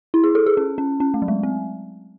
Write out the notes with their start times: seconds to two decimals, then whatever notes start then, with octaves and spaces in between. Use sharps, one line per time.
0.14 E4
0.24 G#4
0.35 A4
0.46 G#4
0.57 C#4
0.78 C#4
1.00 C#4
1.14 A3
1.22 F#3
1.28 G#3
1.43 C4